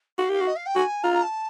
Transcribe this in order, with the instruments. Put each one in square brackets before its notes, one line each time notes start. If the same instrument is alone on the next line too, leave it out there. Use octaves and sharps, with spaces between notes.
[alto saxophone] F#4 [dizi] F5
[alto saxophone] G4 [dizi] F5
[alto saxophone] F#4
[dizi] D#5
F5
G5
[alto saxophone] F#4 [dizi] G#5
[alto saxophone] F4 [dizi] A#5
[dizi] A#5
A5